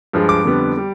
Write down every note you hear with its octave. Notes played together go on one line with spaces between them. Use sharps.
G2 F3 G#3
D6
F2 D3 G3 B3
G3